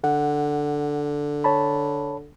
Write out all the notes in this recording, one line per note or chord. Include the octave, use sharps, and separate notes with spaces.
D3 F#5
C#5 A5 B5